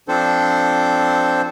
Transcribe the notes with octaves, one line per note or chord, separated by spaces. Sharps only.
F3 C4 D4 A4 C5